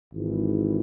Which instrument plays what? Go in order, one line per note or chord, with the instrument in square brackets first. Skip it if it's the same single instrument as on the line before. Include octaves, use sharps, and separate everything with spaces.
[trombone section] G#1 G#2 E3